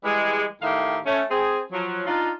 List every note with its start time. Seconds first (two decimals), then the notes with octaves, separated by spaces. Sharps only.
0.05 E3 G3 G#3
0.63 A2 D#3 G4 E5 F5
1.06 A3 C#4
1.31 C4 G#4
1.72 F3 F#3
2.07 D4 D#4 F4